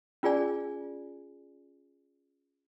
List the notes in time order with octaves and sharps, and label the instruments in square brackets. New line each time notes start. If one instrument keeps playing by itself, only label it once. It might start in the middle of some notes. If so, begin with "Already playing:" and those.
[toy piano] C#4 F4 G#4 D5 G#5